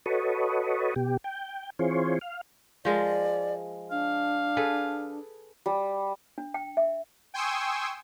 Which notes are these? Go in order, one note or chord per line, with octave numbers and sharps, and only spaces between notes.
F#4 A4 B4 C#5 D#5
B2 G4
G5
E3 C4 F4 G#4 C5 C#5
F5
F3 G#3 A#4 D5
D4 F5
G#4 A4 B4
G3
D4
G5
E5
G5 G#5 C6 C#6 D#6 E6